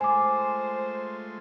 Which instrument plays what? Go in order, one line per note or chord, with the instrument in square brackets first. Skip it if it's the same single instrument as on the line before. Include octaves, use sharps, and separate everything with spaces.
[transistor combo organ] G#3 A3 F4 [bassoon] C5 [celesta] G#5 D6